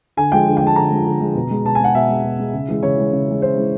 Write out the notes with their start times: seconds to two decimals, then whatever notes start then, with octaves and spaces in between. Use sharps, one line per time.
0.17 D3 G#5
0.32 F3 G#3 G5
0.47 D3
0.57 G5
0.62 F3 G#3 A5
0.76 D3 A#5
0.92 F3 G#3
1.06 D3
1.21 F3 G#3
1.35 B2
1.51 G#3
1.64 B2 A5
1.75 G#5
1.80 G#3 F#5
1.94 B2 E5
2.09 G#3
2.24 B2
2.39 G#3
2.53 C#3
2.68 E3 G#3
2.82 C#3 C#5
2.97 E3 G#3
3.12 C#3
3.27 E3 G#3
3.42 C#3 C5
3.57 E3 G#3